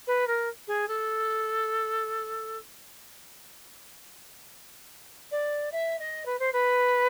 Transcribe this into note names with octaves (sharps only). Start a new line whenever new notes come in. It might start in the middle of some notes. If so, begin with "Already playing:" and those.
B4
A#4
G#4
A4
D5
E5
D#5
B4
C5
B4